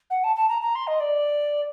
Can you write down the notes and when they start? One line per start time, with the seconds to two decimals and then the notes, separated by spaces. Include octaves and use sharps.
0.10 F#5
0.24 A5
0.36 A5
0.49 A#5
0.62 A#5
0.75 C6
0.87 D#5
1.00 D5